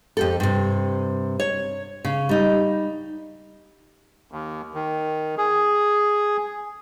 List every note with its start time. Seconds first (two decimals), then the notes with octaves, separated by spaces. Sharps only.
0.17 F2 G4 A4
0.40 G2 C3
1.40 C#5
2.05 C#3
2.29 G3 D#4
4.32 D#2
4.74 D#3
5.38 G#4